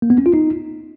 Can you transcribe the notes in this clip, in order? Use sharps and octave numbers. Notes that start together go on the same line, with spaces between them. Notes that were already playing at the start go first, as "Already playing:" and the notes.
A#3
B3
C#4
F4
D#4